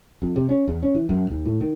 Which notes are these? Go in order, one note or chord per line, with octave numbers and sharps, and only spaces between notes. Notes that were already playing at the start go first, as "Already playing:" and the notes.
F2
C3
C#4
E2
C#4
E3
F#2
D#2
A2
D#3